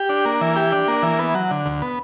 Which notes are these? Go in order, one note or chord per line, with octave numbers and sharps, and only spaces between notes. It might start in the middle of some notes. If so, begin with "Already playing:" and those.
Already playing: G4
D4
A#3
E3
G4
D4
A#3
E3
B3
F#3
D3
D2
B3